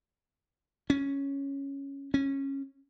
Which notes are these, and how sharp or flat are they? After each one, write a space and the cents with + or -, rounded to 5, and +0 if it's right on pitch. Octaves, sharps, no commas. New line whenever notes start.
C#4 +0
C#4 -15